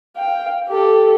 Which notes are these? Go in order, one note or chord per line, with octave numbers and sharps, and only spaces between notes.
F5 G5
G4 A4